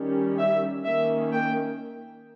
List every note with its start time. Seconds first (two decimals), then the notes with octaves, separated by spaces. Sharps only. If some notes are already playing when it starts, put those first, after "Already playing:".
Already playing: D#3 G3 C#4
0.39 E5
0.84 D#3 A#3 C#4 E5
1.31 G5